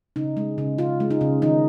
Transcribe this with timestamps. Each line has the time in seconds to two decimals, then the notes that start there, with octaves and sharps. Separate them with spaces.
0.16 C#3 D#4
0.37 G#3
0.58 C#3
0.78 C#3 F4
1.00 G#3
1.10 D#4
1.21 C#3
1.42 D#3 D#4